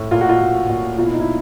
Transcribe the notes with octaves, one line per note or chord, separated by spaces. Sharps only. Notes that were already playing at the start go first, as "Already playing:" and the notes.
Already playing: A2
A#2 F4
F#4
F4
A#2
A#2
B2 F4
E4
D#4
E4